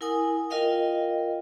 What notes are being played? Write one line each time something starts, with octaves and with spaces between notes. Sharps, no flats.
E4 A#4 F#5 G#5 D#6
F4 A#4 D#5 F5 G5